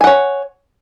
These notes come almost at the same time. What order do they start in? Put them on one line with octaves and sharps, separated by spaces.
G#5 F#5 C#5